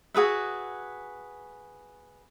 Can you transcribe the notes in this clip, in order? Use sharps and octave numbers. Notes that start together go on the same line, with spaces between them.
F#4 G#4 B4 E5